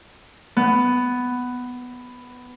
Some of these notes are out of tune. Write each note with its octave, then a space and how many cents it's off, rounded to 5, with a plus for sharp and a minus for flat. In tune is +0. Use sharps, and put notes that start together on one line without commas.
B3 +5